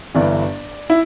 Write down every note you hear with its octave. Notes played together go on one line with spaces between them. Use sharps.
G1 G2 E3 D5
E4